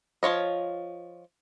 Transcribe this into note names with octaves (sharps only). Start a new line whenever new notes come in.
F3 F4 C#5 D#5